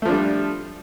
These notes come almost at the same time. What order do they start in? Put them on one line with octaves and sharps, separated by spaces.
A3 F3 D4 G3